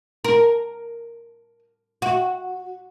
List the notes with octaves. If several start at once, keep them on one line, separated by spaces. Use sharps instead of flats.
A#4
F#4